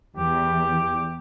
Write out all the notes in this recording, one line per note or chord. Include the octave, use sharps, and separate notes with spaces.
E2 G4